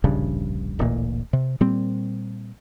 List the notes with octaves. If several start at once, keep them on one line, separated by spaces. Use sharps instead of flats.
D1 A#1 G2 C#3
D1 A1 A#2
C3
A#2 G3 A#3 C4